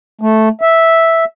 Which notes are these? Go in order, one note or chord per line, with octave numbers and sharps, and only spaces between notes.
A3
E5